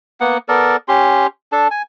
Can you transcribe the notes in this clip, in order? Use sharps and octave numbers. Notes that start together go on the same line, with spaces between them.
A#3 B3 F#5
B3 A4 A#4 D5
C#4 G4 C6
D4 A4 A5
G#5